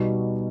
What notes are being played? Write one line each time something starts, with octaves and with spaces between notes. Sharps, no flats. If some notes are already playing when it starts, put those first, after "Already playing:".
Already playing: B2 G3 B3 D#4 F#4